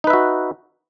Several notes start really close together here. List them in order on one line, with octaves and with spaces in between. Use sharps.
D#4 B4 E5 F#4